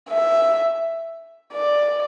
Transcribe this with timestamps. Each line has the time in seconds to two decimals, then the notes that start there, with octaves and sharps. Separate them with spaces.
0.10 E5
1.53 D5